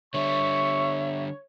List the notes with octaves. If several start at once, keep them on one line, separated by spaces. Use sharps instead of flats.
D3 G3 C#5 E5 C#6